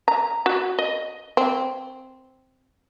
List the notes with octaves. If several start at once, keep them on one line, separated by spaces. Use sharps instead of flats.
A#5
F#4
D#5
C4